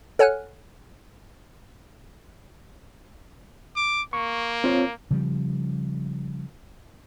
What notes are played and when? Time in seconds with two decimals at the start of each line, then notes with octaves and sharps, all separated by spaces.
0.19 A4 C#5 F#5 G#5 F6 F#6
3.76 D6
4.13 A#3 C#6
4.64 C4 F4 C#5
5.11 C#3 F3 G3